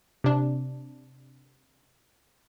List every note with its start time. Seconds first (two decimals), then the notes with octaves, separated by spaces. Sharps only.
0.24 C3 D4